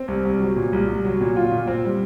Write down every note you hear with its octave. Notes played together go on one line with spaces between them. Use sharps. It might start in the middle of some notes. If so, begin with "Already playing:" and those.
Already playing: C4
C2
C2
F#3
A#2
C2
C2
F#3
A#2
F4
A#2
C4
G3